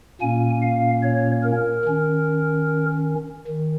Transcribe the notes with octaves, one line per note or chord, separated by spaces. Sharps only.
A#2 A#3 C#4 G#5
F5
C#5
A#4
D#3 C#4
D#3